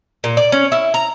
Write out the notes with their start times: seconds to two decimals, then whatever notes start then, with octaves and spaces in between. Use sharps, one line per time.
0.24 A#2
0.37 D5
0.52 C#4
0.72 E4
0.94 A#5